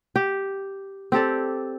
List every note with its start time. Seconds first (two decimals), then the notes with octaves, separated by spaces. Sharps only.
0.16 G4
1.12 C4 G4 A4 D5